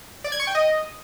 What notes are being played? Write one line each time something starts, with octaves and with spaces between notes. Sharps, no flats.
D5
G#6
C#6
G5
D#5